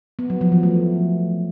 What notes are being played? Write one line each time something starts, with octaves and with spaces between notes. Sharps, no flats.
B3
F#3
F3
E3
A3